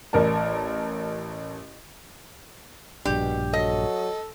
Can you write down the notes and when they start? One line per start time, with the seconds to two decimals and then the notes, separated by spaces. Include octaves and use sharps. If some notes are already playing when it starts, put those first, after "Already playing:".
0.13 A1 A#4 D5 A5
3.05 A#1 G2 B2 D4 G4
3.53 F#3 A4 D#5